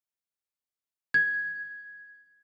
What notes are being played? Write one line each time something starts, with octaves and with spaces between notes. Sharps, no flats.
G#6